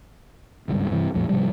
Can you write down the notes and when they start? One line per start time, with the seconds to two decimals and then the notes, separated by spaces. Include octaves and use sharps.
0.68 G#1 C#2 G2
0.90 G2 C3 E3
1.14 A#1 F2 A2
1.29 G#2 C3 F3 G3